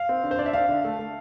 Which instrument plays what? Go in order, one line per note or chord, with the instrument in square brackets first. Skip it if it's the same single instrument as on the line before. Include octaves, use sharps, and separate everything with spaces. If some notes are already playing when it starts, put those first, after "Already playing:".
Already playing: [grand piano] F5
C4
D3
C5
D4 D5
E5
D4 F5
D3
A3
A3